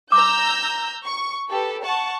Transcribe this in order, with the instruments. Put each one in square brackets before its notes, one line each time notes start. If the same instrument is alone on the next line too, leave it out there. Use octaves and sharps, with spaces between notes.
[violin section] A#5 E6 G6 [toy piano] D6
[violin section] C#6
G4 A4 B4
F#5 A5 C#6